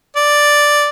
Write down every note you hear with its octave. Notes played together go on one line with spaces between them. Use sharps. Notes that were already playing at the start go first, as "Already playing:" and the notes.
D5